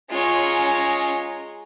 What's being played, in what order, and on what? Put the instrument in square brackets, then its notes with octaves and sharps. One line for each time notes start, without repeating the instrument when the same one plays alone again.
[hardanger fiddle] G#3 A#5 [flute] C#4 [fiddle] F4 C#5